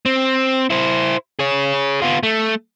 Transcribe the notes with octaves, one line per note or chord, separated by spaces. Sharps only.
C4
E4 C5
G#4 C#5
B3 F4
A3